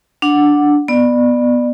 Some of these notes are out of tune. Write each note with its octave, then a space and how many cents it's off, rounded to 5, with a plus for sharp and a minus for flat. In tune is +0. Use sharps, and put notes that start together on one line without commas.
D4 +0 F#5 -5
B3 -5 D5 +25